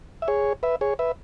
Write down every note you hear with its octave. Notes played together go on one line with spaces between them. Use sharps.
E5
G#4 C#5
B4 E5
G#4 C#5
B4 E5